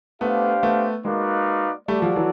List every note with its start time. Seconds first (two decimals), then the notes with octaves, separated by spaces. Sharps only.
0.21 A3 B3 D4 G4 C5 F5
0.63 A3 B3
1.05 G#3 A#3 D#4 F#4 B4 D5 F5
1.88 G3 A3 F#4 A4 D5
2.02 F3 G3
2.16 E3 F#3